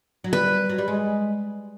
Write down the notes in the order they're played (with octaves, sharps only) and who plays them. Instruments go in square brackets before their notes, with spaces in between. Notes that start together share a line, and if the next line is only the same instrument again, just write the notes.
[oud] F#3
[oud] G3 [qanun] B4
[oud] F#3
G3
G#3